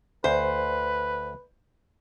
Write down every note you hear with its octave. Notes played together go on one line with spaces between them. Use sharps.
D2 B4 C5